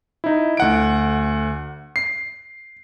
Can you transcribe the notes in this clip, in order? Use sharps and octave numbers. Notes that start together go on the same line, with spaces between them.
D#4 E4
D2 F#5 D7
C7